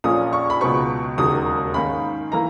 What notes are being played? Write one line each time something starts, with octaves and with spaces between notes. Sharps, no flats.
A#1 A#2 A#3 C#4 D#6
C#6
B5
C#2 B2 F#3 B3 C#6
E1 D#2 C#3 F#3 D#6
G#2 D#3 A#3 C#4 B5
E3 A#3 A#5